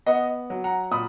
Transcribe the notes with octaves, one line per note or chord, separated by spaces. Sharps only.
B3 D#5 F#5
F#3
F#5 A#5
A#2 B5 D#6